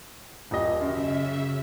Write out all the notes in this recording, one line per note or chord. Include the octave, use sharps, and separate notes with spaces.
D#1 G4 D#5
F#2 C#3 E5